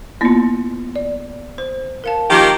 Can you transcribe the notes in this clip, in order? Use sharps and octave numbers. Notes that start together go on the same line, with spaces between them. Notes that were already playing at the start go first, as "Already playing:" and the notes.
A#3 B3 E4 F4
D5
C5
A#4 F5 A5
D#3 F3 A#3 F4 G4